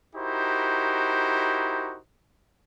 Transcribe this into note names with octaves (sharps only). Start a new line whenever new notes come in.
D#4 E4 F#4 G4 A#4 C5